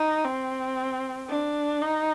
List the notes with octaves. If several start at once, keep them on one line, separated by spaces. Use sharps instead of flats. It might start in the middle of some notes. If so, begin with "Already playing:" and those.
Already playing: D#4
C4
D4
D#4